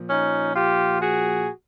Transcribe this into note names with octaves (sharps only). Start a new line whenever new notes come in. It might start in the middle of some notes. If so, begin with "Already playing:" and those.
Already playing: A#2 F3
C#4 D#4
F4 G4
F#4 G#4